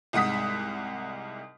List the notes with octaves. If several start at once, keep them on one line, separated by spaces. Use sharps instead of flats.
C2 G#2 F#5 D#6 B6